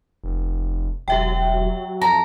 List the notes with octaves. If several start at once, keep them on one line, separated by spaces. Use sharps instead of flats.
F1
E1 F#3 G4 E5 G5
F2 A5 A#5